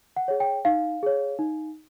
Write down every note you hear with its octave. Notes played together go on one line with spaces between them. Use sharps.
F#5
G#4 C#5
G5
D#4 F5
G#4 C#5
D#4